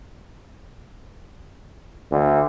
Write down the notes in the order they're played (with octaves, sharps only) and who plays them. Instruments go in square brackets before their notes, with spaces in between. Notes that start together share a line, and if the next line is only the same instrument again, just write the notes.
[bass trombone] D2